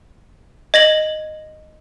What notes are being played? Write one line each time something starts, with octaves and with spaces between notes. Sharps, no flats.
D#5 A#6 F#7